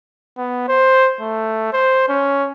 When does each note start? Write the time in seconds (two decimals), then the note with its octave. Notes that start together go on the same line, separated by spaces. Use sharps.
0.38 B3
0.68 C5
1.21 A3
1.73 C5
2.09 C#4